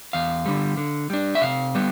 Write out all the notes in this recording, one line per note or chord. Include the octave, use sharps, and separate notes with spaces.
E2 F5
D3 G3
D3
G3 D4
E5
C3 F5
G3 B3